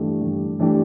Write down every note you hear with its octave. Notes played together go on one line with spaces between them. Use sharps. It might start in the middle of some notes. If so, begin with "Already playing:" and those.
Already playing: G2 E3 A3 D4 G4
G2
E3 A3 D4 G4